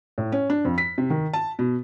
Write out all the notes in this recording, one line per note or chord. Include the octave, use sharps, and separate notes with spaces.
A2
C#4
D4
F2
B6
C3
D#3
A5
B2